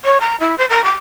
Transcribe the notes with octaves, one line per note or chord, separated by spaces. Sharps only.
C#5
A#5
E4
C5
A#4
D6